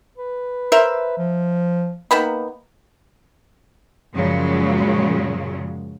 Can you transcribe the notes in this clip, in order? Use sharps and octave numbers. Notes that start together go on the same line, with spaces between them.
B4
A#4 C5 E5
F3
D#3 A#3 B3 B5
F#2 A#2 C#3 F3 F#3 G#3